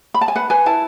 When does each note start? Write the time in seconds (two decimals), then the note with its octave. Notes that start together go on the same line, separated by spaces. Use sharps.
0.14 B5
0.21 A5
0.28 G#5
0.36 B4 F#5
0.50 B4 G#5
0.66 E4 A5